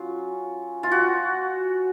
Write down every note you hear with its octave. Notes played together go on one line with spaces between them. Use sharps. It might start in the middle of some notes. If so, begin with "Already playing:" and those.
Already playing: F#3 C#4 F4
F4
F#4